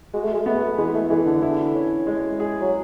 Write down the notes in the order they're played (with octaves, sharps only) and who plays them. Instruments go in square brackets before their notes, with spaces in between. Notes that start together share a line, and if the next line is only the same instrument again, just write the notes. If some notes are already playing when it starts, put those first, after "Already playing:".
[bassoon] G#3 [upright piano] F#4
[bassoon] A3
G#3
[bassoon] A3 [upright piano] B3
[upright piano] E3 [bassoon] G#3
[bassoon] A3
[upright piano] E3 [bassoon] G#3
[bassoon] D3
[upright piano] E4
C#4
G#3
G#4
[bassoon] F#3